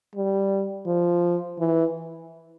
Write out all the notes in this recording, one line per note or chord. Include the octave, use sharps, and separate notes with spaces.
G3
F3
E3